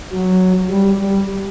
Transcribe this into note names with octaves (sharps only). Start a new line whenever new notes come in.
F#3
G3
G3